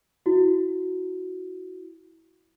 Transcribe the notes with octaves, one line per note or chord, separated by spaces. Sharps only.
E4 F#4